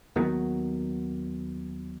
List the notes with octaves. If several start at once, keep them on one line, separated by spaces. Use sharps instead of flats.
D#2 D#3 F#3 B3